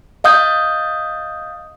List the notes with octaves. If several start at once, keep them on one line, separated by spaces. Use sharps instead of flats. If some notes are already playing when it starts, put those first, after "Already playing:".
D#5 F5 D#6 G6